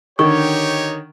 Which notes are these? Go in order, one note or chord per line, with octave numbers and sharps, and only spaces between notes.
D3 D#3 D#4 G4 C#5 C#6